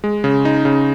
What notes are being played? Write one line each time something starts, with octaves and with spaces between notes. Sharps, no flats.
G#3
C#3
D#4
C#3